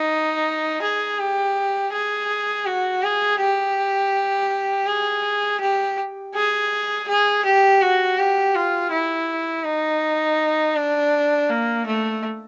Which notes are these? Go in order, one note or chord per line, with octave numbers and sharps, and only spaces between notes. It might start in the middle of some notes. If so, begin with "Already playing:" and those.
Already playing: D#4
G#4
G4
G#4
F#4
G#4
G4
G#4
G4
G#4
G#4
G4
F#4
G4
F4
E4
D#4
D4
A#3
A3